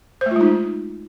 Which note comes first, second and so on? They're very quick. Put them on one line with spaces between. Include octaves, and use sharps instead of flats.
C5 A3 F4 G#3 D#4